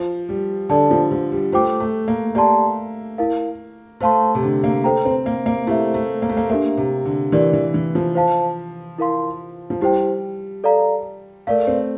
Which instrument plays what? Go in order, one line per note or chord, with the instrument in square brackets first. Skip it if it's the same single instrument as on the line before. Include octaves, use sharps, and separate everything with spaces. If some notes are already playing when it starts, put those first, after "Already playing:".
Already playing: [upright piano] F3
G3
[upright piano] D3 [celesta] A4 D5 A5
[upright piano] F3
F3
G3
[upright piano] A3 [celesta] F4 C5 G5 D6
[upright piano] A3
A#3
[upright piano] A#3 [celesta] G4 D5 A5 C6
[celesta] E4 A#4 F5
[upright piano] A3 [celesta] C5 F5 A5 C6
[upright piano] C3
D3
A#3
[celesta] A4 C5 G5 A#5
[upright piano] C4
A#3
A#3
[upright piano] A3 [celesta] E4 G4 C5 E5
[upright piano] A3
A#3
A3
A#3
[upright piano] A#3 [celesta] D4 G4 A#4 E5
[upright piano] C3
D3
[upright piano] E3 [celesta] G4 A#4 D5
[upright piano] E3
E3
F3
[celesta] C5 F5 A5
E4 A#4 F5 C6
[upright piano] F3
[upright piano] G3 [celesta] E4 G4 C5 G5
[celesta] A4 D5 F5 A#5
[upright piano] A3 [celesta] A#4 D5 F5
[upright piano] C4